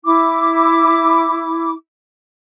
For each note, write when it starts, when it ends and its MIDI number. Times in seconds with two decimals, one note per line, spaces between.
0.04 1.71 64
0.04 1.71 86